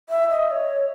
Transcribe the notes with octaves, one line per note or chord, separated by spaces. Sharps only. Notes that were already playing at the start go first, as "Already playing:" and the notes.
E5
D#5
C#5